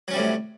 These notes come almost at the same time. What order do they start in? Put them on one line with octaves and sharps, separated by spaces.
F#3 C#4 G3 C3 A2